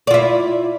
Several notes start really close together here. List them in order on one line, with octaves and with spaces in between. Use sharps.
D5 F4 E4